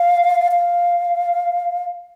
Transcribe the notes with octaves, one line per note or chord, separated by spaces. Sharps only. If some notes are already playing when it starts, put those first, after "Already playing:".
Already playing: F5
F5